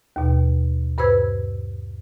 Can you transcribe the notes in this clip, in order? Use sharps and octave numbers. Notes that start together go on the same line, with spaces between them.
D#2 B2
G2 B4 C5 E6 G#6